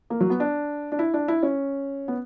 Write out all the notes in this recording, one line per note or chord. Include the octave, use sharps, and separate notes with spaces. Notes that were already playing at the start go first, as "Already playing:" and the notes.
A#3
F#3
B3
D4
D4
E4
D4
E4
C#4
B3